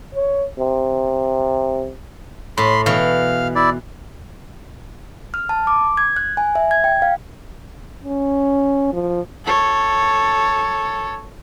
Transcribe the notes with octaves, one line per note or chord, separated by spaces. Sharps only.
C#5
C3
A2 B5 C6
B2 E3 F5
E4 D5
F6
A5
D6
G#6
F#6
G#5
E5
G#6
G5
F5
C#4
F3
A4 C#5